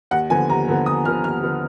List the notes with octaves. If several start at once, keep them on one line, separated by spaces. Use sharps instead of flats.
D#2 F#5
D3 F3 B3 G#5
D#2 A#5
D3 F3 B3
D#2 D#6
D3 F3 B3 F6
D#2 F6
D3 F3 B3